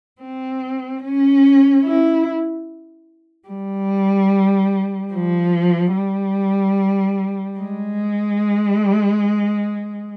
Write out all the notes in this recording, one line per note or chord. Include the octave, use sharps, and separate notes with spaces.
C4
C#4
E4
G3
F3
G3
G#3